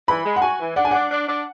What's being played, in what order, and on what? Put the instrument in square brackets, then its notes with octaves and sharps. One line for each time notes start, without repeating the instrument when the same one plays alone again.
[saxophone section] E3 [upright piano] B5
[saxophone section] G#3
[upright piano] F#5
[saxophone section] F#4 [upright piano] G#5
[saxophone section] E3
[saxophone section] D4 [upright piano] F#5
[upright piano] G#5
[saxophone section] D4 [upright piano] F#5
[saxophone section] D4
D4